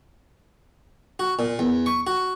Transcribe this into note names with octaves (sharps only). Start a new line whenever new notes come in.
F#4
A#2
E2
C#6
F#4